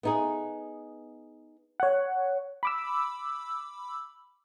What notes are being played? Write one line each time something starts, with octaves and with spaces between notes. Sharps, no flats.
B3 D#4 G#4
C#5 F#5
B5 D6 E6